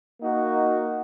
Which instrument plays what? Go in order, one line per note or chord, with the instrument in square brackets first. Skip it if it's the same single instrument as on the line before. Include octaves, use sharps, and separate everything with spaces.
[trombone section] A#3 D#4 F#4